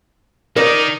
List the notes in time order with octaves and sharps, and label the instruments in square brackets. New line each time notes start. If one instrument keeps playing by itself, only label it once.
[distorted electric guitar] D#3 D#4 [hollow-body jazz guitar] A#4 D5